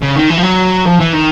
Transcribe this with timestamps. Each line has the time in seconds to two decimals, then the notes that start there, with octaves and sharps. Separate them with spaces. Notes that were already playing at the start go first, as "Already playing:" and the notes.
0.02 C#3
0.15 D#3
0.30 E3
0.38 F3
0.43 F#3
0.86 F3
0.99 E3
1.13 D#3